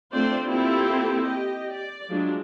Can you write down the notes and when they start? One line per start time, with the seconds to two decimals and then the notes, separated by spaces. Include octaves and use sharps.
0.12 A3 C4 D4 F4 C5 D5
0.47 A#3 C4 E4 F4 G4 A4
1.23 G4 D#5
1.70 D5
2.09 F3 F#3 G#3 D4